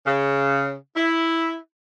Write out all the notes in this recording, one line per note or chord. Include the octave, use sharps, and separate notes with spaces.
C#3
E4